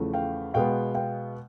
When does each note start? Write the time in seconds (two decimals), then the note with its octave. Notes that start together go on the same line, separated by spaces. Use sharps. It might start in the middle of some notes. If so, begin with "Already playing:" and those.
Already playing: E2 C#3 F3 A3
0.13 F5 G5
0.54 B2 G#3 B3 F5 G5
0.94 F5 G5